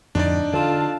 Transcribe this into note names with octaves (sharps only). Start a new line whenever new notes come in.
F2 A2 D3 D4 D#4 D5
D3 F4 A4 F5 A5